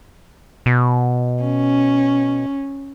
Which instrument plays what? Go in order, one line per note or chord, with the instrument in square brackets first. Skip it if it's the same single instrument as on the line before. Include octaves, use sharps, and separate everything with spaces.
[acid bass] B2
[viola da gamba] C#4